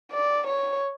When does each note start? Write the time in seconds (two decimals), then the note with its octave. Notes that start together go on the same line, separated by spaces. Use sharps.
0.12 D5
0.47 C#5